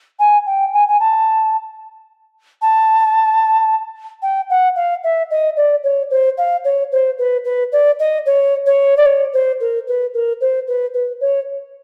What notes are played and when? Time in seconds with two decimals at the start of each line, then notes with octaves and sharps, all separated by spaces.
0.19 G#5
0.46 G5
0.73 G#5
0.88 G#5
1.00 A5
2.62 A5
4.22 G5
4.50 F#5
4.76 F5
5.04 E5
5.30 D#5
5.56 D5
5.84 C#5
6.10 C5
6.38 F5
6.64 C#5
6.92 C5
7.18 B4
7.45 B4
7.72 D5
7.99 D#5
8.26 C#5
8.66 C#5
8.97 D5
9.06 C#5
9.33 C5
9.60 A#4
9.87 B4
10.14 A#4
10.41 C5
10.67 B4
10.94 B4
11.20 C#5